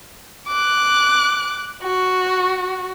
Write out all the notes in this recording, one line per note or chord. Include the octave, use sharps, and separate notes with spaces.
D6 F#6
F#4